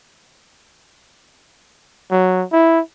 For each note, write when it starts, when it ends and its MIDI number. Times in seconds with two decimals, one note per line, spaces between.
2.11 2.44 54
2.52 2.80 64